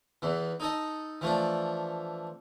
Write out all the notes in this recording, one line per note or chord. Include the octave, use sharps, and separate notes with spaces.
E2 E3
D#4 A4 D#5
E3 F3 A3 D4